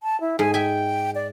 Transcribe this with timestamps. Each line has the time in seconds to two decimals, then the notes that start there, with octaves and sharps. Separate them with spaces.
0.03 A5
0.21 E4
0.39 G#2 G#5
0.54 E5 G5 G#5
1.15 D5